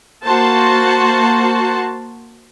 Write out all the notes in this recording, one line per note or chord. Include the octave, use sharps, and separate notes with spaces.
A#3 F#4 C5 A5